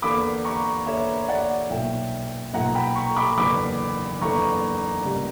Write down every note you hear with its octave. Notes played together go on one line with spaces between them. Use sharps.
E2 D3 A#3 B5 D6
A#5 C#6
E2 D3 A#3 C#5 E5
D5 F#5
B1 A#2 A#3 E5 G5
B1 A#2 A#3 F#5 A#5
G5 B5
A#5 C#6
B5 D6
F#1 E2 D3 A#3 B5 D6
F#1 E2 D3 A#3 A#5 C#6
C#2 C#3 G3 A#3